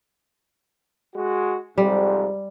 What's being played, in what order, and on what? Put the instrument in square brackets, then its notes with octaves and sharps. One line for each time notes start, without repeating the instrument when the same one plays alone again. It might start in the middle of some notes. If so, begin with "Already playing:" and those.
[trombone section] G#3 F#4
[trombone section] F2 G#2 C3 [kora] G3